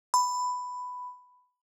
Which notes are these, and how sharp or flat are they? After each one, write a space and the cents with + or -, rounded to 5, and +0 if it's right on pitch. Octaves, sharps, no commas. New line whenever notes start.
B5 +10